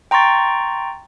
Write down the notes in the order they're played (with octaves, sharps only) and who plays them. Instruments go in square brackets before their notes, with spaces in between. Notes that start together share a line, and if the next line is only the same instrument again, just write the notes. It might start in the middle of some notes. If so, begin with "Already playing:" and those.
[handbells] G5 A#5 C6 C#6 A6